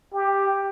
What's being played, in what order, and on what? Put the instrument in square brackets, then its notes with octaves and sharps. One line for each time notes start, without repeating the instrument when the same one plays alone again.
[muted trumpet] G4